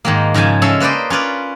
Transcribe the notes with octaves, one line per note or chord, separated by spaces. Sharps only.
G#2 D#3 A#3
G#2 C#3 F3 G#5 A5
G#3 C#4 A4 E5
A#3 B4 C5 D5 D#5
C#4 F4 B4 D5